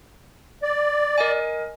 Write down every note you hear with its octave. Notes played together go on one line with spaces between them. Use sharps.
D5
A#4 D#5 G#5